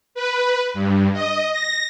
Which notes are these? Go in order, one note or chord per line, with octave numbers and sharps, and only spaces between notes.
B4
G2
D#5
A#6